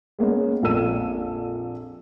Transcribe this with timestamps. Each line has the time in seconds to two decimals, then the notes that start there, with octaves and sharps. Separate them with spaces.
0.19 G#3 A#3 B3 C#4
0.62 A#1 F2 A#3 A4 E6 D#7